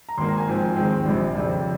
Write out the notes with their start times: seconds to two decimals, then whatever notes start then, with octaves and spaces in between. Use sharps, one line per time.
0.09 A#5
0.18 G#1 G#2 D#3 A#3 C6
0.28 A#5
0.38 G#5
0.47 G#2 F3 C4
0.76 D#2 D#3 G#3 C4 G5
1.06 A#1 A#2 G3
1.35 F2 C#3 G3 C4